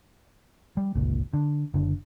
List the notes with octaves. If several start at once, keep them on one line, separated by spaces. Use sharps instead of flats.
G3
G1 C#2 A#2
D3
F#1 D3